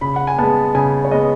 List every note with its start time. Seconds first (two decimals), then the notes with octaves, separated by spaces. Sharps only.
0.01 C#3 B5
0.16 F#5
0.27 G#5
0.38 G#3 B3 A5
0.75 C#3 G#5
1.05 C#5
1.11 G#3 B3 D#5